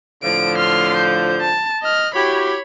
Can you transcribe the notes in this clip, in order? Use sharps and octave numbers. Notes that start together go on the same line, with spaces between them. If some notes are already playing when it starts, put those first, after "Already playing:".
A2 D3 F3 D7
C6 F6
G6
A5
D#5 F6
E4 F#4 G4 C#5 B5